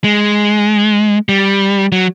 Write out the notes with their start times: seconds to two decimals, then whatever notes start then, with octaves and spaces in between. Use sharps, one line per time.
0.04 G#3
1.29 G3
1.92 F#3